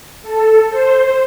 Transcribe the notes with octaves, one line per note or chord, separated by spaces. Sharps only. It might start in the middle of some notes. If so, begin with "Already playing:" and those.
A4
C5